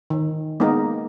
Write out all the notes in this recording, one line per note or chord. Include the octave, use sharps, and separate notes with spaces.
D#3
G#3 A#3 B3 D#4 A#4